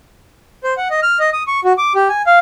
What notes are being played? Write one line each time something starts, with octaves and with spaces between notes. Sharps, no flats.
C5
F#5
D#5
F6
D#5
D#6
C#6
F#4
D6
G4
G#5
F5